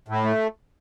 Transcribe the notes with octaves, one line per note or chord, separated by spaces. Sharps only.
A2
A3